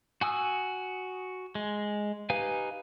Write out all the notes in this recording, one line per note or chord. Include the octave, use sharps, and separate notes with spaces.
F#4 G#5 D#6 E6
G#3
D#4 G4 B4 F5 G#5